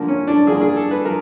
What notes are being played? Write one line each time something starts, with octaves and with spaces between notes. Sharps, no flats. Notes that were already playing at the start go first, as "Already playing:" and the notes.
Already playing: D3 F3 A#3
C#4
D4
D3 F3 A#3 G#4
G#4
A4
B4
F3 A#4